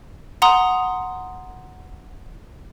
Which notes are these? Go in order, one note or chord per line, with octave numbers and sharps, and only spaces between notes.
F#5 A#5 C6 D#6